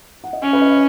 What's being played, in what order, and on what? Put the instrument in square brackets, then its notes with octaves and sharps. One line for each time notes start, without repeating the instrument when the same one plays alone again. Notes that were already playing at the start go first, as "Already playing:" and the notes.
[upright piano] F#5
D#5
[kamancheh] C#4 [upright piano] C#5
[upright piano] B4
D#5
D#5